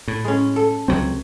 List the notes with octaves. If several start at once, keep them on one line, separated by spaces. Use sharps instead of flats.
A2
G#3 C#4
A4
C#2 F#3 C4